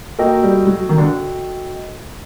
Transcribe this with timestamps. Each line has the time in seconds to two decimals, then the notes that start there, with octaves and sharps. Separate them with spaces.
0.19 A#3 F#4 A4 D#5 G5
0.43 G3
0.67 F#3
0.89 D#3
0.98 D3